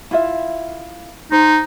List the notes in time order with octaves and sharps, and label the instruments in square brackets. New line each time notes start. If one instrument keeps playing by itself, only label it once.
[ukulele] E4 F4 E5
[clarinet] D#4 [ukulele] C5